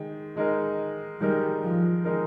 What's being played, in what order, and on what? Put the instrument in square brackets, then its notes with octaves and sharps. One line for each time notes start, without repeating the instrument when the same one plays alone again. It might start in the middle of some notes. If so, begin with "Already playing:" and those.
Already playing: [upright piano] D#3 G#3 D#4
D#3 G#3 D#4 A#4
[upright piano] D#3 G#3 D#4 A#4 [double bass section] G3
[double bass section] F3
[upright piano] D#3 G#3 D#4 A#4